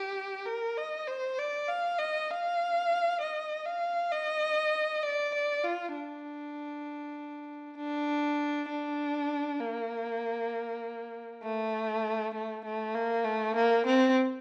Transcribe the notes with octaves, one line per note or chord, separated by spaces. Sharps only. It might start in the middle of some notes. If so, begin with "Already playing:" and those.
Already playing: G4
A#4
D#5
C5
D5
F5
D#5
F5
D#5
F5
D#5
D5
D5
F4
D4
D4
D4
A#3
A3
A3
A3
A#3
A3
A#3
C4